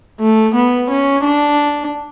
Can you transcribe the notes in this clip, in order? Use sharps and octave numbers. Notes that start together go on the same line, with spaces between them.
A3
B3
C#4
D4